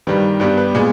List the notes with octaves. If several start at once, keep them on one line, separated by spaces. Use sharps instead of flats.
G2 D#3 G3 B4
G2 G3 B3 B4
B4
A#2 G#3 B3